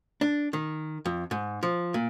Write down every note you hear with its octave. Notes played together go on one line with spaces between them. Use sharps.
D4
D#3
F2
G#2
F3
A#2